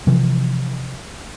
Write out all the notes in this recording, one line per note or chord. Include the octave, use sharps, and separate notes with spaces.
C3 E3 F3